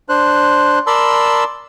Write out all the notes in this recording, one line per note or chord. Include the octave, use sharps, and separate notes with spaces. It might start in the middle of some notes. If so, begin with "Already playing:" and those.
D4 C5 F#6
A#4 D5 A5 B5 C6 E6